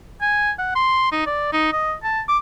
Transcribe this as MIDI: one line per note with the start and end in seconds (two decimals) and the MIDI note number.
0.22 0.51 80
0.59 0.73 78
0.75 1.09 84
1.12 1.26 63
1.26 1.51 74
1.53 1.71 63
1.72 1.94 75
2.04 2.21 81
2.29 2.38 86